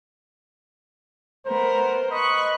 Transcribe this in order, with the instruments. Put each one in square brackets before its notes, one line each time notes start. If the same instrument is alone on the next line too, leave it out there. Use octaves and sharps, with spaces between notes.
[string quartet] A3 B3 A#4 [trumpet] C5
[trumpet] D#5 [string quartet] B5 C#6 F#6